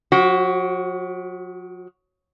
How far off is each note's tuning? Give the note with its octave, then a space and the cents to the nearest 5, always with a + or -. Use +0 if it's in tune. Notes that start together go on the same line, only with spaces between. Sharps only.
F#3 -45 F#4 +15